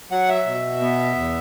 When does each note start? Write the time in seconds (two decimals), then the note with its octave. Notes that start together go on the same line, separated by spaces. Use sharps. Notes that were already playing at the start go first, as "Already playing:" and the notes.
0.11 F#3 F#5
0.29 E5
0.46 B2
0.81 B3
1.16 E2